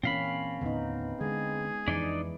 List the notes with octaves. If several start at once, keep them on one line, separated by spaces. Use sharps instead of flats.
A#2 E3 A#3 C4 C#4 F5 B5
D#2 A2 D3 B3 D#4
D3 G#3 G#4
F2 E3 D4 D#4 D5